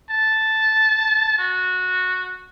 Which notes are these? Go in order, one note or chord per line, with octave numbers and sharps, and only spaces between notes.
A5
F#4